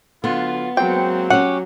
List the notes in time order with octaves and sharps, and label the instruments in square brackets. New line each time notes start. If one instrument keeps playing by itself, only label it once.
[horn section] D3 F#3 F4 [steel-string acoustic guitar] B3
[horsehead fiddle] F#3 [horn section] G#3 A#3 C4 [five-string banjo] G5
[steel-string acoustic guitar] C#4 G4 [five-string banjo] F#5